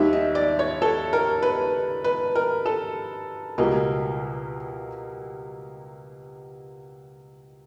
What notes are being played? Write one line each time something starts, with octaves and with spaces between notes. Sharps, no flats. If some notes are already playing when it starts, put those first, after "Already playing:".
Already playing: D#2 D#3 G3 E5
D#5
D5
C#5
A4
A#4
B4
B4
A#4
A4
C#2 B2 G3 A#3 D#5